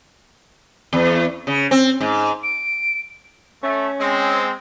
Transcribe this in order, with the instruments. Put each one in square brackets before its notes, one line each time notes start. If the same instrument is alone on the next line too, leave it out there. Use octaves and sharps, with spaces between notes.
[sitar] E2
C#3
C4
G#2
[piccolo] D7
[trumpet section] A3 [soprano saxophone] C#4
[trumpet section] G#3 C4